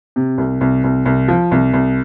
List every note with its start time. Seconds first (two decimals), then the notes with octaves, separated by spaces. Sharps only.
0.16 C3
0.38 C2
0.61 C2
0.84 C2
1.06 C2
1.28 F3
1.51 C2
1.73 C2